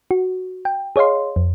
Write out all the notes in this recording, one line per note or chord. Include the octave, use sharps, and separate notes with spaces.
F#4
G5
G#4 C#5 D#5 F5 C6
F2